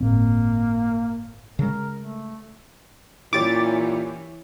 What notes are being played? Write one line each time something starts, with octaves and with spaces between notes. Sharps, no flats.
G1 A2 A#3 C4
C#3 G#3 A#4
A3
A#2 E3 C#4 E4 G4 C#5 D6 A6